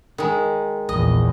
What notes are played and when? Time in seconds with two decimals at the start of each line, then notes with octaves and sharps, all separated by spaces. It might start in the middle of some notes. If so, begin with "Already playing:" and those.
0.18 D#3 G#3
0.89 A#1 E2 D#5